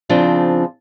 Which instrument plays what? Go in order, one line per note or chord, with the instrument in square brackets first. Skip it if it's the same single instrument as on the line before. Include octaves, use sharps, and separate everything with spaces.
[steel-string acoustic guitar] C#3 F3 C4 D4